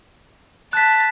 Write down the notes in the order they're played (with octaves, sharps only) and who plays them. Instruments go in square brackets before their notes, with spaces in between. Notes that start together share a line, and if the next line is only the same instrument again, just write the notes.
[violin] A5 [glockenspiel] F#6 B6